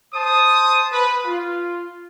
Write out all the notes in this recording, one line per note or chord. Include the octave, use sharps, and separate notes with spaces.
C5 A5 D#6
B4
F4